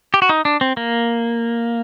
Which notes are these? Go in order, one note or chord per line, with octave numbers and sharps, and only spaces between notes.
G4
F#4
D#4
D4
C4
A#3